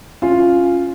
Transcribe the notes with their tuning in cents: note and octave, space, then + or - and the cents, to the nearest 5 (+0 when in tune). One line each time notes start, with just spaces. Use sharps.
C#4 +0 F4 +0